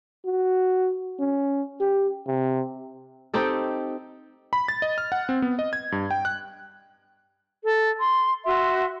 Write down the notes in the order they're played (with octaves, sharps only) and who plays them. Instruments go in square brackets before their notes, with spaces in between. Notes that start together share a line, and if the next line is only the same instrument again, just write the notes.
[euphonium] F#4
C#4
G4
C3
[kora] C4 D#4 G4 A4
[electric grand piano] B5
A6
D#5
F6
F#5
C4
B3
D#5
G#6
G2
G5
F#6
[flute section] A4
C6
F#4 E5 C6